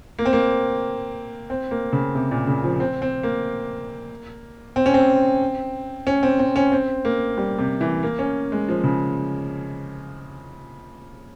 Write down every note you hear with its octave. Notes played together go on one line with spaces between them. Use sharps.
A#3
C4
A#3
C4
A#3
C#3
C3
A#2
C#3
F3
C4
C4
A#3
C4
C#4
C4
C#4
C4
C4
C#4
C4
A#3
G3
C3
E3
A#3
C#4
G#3
F3
C#3